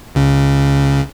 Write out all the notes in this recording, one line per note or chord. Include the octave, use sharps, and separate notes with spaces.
C#2 C#3